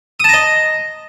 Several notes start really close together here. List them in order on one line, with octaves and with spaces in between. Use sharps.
D#6 A5 A#5 D#5